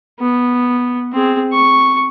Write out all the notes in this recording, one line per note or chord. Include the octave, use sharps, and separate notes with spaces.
B3
C4 G#4
C#6